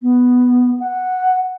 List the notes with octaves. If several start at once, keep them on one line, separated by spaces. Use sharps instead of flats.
B3
F#5